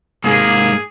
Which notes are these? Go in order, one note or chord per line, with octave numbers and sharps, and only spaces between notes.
G#2 A#3 G#4